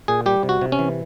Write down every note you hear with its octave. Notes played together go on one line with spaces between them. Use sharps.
A#2 G#4
G3 G4
C3
F#4
C3
C#4
E3